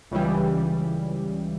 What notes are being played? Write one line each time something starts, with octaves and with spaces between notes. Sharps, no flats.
C#2 C#3 E3 G3